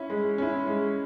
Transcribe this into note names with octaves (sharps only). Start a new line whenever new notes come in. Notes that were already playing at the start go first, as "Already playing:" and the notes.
Already playing: C#4 E4
G#3
C#4 E4
G#3